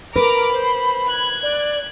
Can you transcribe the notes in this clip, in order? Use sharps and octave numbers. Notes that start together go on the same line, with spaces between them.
A#4 B4 A#5 B5 D6 F6
C5
F#6 G#6
D5